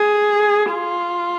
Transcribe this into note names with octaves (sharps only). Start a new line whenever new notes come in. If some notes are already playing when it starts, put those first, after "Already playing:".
Already playing: G#4
F4